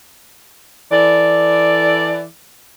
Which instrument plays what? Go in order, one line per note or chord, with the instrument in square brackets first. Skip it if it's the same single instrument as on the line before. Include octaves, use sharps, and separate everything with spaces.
[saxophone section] E3 A4 D5